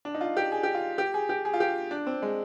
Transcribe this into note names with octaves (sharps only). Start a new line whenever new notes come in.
D4
D#4
F4
G4
G#4
G4
F4
G4
G#4
G4
G#4
F4
G4
D4
C4
G#3